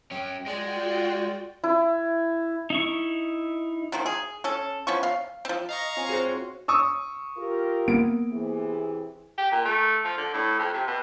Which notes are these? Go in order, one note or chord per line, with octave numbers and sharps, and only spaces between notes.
F#3 C#4 G5
G#3 F4 F#4 G#4 D5 G5
E4
D#4 E4 C#6
B2 D#3 F3
G#4
C#4 A4
F3 B3 C#4 C#6
F5
F3 C4
D#5 F5 A#5 C#6
C4 F4 C#5 G#5
F#4 G#4 C5
C#6 D#6 E6
F4 G4 A#4
A#3 B3 D7
C3 E3 G#4
G4
A#2
A3
F3
D3
A2
F2
C3
B2